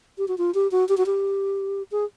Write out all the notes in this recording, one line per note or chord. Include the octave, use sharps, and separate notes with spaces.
G4
F#4
F4
G4
F#4
G4
F#4
G4
G#4